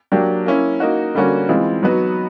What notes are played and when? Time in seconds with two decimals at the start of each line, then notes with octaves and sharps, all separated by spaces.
0.12 F#3 A#3 D4 G4
0.46 A#3 C#4 E4
0.80 A#3 D#4 F#4
1.14 D3 G3 A#3 C#4 F#4
1.49 E3 G#3 C4 F4
1.83 F#3 B3 D#4 F#4 B4